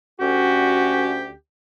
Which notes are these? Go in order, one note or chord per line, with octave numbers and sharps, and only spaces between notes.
D2 C#4 F#4 G4